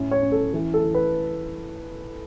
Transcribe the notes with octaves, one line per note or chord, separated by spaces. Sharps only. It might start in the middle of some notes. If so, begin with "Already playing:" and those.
Already playing: A2 C#4 E4
C#5
C#4
A4
E3
A4
E3
B4